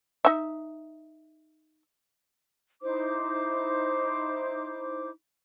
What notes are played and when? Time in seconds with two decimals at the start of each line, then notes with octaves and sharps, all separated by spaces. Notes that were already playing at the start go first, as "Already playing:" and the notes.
0.25 D#4 E5
2.82 D#4 E4 C5 D6